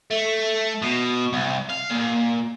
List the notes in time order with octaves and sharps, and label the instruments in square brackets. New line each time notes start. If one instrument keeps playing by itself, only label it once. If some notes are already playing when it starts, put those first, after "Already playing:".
[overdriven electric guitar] A3
B2
C2
F5
A#2